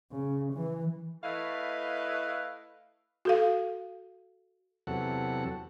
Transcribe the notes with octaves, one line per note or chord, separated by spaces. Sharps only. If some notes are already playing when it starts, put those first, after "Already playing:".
C#3
E3
A3 E4 B4 D#5 F5
F#4 A4 F5
E2 C3 F#3 A4 F#5